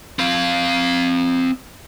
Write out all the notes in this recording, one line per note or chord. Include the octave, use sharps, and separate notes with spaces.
C4 F5